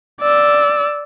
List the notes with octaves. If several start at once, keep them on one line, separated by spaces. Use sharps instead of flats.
D5 E6